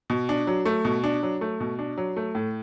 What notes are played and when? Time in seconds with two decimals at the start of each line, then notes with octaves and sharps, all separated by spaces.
0.10 B2
0.29 D4
0.47 F#3
0.65 A3
0.85 B2
1.04 D4
1.23 F#3
1.41 A3
1.60 B2
1.79 D4
1.98 F#3
2.17 A3
2.35 A2